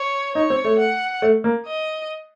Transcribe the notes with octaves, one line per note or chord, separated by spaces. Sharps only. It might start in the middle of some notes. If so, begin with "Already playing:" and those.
Already playing: C#5
D#4 C#5
C4
A3
F#5
A3
A#3
D#5